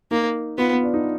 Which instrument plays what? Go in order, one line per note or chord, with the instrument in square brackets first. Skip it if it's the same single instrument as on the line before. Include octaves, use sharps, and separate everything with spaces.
[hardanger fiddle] A#3 [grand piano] D#4
[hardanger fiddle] B3 [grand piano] F4
[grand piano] B3
D4
D#4